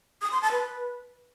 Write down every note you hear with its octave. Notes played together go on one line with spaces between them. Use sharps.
D#6
C6
A5
B4